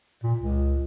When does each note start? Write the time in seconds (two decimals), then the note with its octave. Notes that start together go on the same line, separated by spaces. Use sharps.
0.23 A#2
0.38 C#2